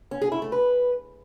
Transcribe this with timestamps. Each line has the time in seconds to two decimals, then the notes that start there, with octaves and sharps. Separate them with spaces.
0.11 C#4
0.22 G#4
0.32 E4
0.42 A3
0.52 B4